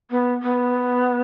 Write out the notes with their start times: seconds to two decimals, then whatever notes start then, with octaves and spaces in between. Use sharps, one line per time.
0.11 B3
0.43 B3